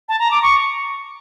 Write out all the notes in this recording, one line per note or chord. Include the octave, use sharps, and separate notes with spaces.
A5
A#5
D6
C#6